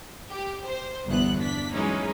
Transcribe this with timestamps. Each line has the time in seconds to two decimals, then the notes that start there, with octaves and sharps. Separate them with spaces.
0.31 G4
0.66 C5
1.07 G1 E2 B3 F#6
1.39 D4 B6
1.73 E3 F#3 G#3 C#4 D#4